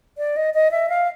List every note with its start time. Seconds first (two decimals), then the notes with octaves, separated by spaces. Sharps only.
0.18 D5
0.36 D#5
0.54 D#5
0.71 E5
0.89 F5